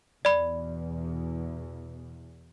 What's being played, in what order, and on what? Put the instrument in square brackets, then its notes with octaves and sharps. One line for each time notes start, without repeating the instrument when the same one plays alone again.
[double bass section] E2 B2 [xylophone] D5 B5